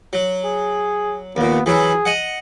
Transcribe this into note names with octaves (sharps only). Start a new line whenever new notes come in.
F#3
G#4
D#2 A#2 B3
E3 F#3 E4 G#4
D#5 F#5